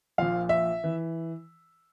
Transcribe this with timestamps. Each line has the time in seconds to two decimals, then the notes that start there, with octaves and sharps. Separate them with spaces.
0.18 A#1 A#2 F3 F5
0.49 E5
0.84 E3